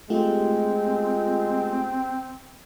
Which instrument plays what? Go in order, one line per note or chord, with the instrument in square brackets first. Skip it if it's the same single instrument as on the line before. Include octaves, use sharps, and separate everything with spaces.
[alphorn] G#3 [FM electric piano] A3 F4 G4 [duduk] C4